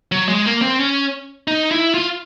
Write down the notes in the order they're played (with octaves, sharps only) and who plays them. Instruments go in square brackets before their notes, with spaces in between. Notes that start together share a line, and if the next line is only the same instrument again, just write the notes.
[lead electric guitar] F#3
G#3
A#3
C4
C#4
D#4
E4
F4